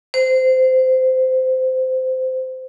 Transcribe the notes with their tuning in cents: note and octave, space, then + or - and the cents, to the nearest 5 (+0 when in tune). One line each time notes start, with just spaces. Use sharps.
C5 -20